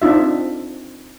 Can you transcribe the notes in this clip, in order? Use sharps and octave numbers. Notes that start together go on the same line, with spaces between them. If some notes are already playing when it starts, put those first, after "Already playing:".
C4 D4 D#4 F4 E5